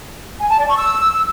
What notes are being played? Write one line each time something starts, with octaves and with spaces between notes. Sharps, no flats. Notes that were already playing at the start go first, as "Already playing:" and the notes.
G#5
A5
D5
C#6
E6